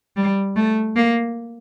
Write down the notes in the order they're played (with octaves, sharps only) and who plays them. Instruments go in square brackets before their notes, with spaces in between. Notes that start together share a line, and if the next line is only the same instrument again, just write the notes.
[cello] G3
A3
A#3